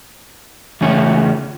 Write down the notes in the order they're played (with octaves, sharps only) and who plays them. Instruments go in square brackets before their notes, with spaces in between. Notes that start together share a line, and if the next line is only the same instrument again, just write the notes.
[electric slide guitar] C#3 E3 A3 C#4 F4